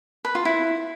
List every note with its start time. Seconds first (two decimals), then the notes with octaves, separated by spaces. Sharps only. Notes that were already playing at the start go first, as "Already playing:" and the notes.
0.25 B4
0.35 F4
0.45 E4